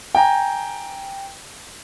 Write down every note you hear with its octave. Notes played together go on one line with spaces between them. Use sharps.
G5 G#5 A#5